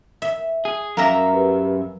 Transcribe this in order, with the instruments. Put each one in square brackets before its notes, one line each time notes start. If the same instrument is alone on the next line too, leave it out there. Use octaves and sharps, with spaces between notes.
[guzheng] E5
[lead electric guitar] G#4
[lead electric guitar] F#2 E5 [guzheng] A#3 A#4 A#5
[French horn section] G4 B4